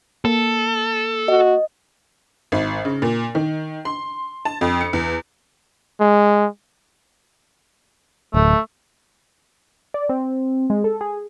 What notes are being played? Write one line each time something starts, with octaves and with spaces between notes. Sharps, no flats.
A#3 A4
F#4 D#5
G#1
C#3
A#2
D#3
C6
A5
F2
C#7
E2
G#3
D1 A3
D5
C4
G#3
A4
G#4